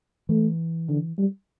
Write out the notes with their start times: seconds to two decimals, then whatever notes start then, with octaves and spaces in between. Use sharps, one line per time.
0.29 E3 A3
0.89 D3
1.18 G3